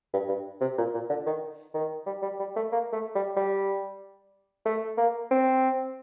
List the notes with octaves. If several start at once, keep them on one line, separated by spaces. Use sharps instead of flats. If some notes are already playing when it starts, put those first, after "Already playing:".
G2
G2
C3
A#2
A#2
D3
D#3
D#3
G3
G3
G3
A3
A#3
A3
G3
G3
A3
A#3
C4